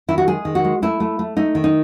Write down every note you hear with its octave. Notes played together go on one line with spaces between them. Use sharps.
D#3 E4
F#4
G#3 G#4
D#3
F#4
G#3
A3 E4
A3
A3
A3 D#4
D#3
D#4